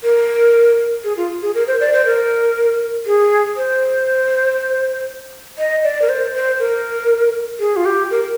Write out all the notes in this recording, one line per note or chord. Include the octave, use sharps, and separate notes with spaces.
A#4
G#4
F4
G#4
A#4
C5
D5
C5
A#4
G#4
C5
D#5
D5
A#4
C5
C5
A#4
G#4
F4
G4
A#4